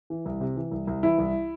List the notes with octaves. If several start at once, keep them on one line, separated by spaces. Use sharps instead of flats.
E3
C2
C3
E3
C2
C2
E3 E4
C2